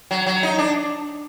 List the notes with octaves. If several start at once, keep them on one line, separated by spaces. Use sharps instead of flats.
F#3
F#3
D#4
D4